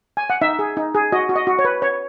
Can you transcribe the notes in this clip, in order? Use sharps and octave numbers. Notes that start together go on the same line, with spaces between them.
G#5
F#5
D#4 E5
G#4
D#4
G#4
F#4 D#5
F#4
D#5
F#4
C#5
B4
C#5